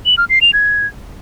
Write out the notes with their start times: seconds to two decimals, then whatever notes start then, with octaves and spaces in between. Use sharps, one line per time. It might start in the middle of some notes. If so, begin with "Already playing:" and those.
0.06 F#7
0.18 F6
0.30 C7
0.41 F7
0.53 G#6